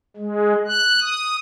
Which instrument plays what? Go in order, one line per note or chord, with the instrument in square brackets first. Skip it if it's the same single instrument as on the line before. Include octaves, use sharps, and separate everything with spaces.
[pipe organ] G#3
F#6
D#6